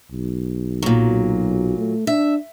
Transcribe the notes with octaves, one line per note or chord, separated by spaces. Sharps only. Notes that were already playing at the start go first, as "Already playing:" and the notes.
B1
A#2 F#3
A3
D4 E5